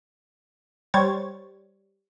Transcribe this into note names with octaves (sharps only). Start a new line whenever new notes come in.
G3 C5 C#5 G#6 A6